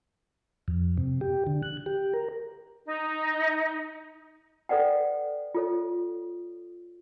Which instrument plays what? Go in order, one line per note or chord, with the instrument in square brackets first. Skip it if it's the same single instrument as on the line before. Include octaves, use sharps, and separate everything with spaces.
[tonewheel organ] F2
C3
G4
D3
F#6
G4
A#4
[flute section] D#4
[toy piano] A4 B4 D5 F#5 G5
F4 A4 C#5